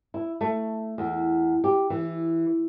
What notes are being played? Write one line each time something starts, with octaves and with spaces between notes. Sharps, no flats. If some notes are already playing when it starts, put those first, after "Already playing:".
E4
A3
E2
G4
E3